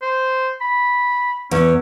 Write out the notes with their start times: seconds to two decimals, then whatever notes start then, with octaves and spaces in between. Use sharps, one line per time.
0.02 C5
0.61 B5
1.51 E2 C#4